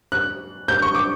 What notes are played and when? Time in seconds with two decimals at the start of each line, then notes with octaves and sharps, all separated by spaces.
0.12 F#6
0.68 G6
0.82 C#6
0.95 D6